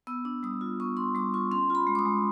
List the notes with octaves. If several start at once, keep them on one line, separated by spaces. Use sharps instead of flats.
B3 E6
D4
G3 D#6
F4
B3 C#6
D4 C6
G3 D6
F4 C#6
C#4 C6
F4 B5
G#3
D6
D#6
G#3